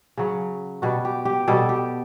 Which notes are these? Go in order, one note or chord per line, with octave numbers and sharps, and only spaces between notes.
C#3 F#3
B2 G3 F#4
G4
G4
B2 G3 A4
G4